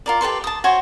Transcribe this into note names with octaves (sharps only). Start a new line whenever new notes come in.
F4 A#4 D5
G4 A4 B4 C6
A5 D#6
F#4 C5 C#5 G#5